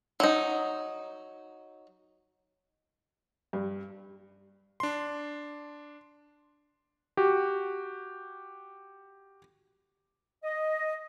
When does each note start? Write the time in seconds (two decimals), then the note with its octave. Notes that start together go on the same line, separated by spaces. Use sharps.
0.20 F#3 D#4
3.53 G2
4.80 D4 C6
7.17 F#4 G4
10.44 D#5